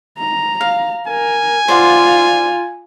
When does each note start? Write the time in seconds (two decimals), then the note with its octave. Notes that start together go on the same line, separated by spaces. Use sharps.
0.18 A#5
0.61 F5
1.07 A#4 G#5
1.68 F4 C5 D5 F#5